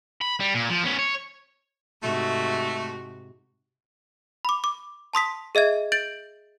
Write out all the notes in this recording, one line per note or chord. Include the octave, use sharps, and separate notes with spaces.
B5
G3
A#2
F3
B3 C#4
C#5
G#2 C3 A3 F#4
B5 D6
D6
A5 C6 D#6 B6
G#4 D#5 E5 G#6
G6 A6 D7 F#7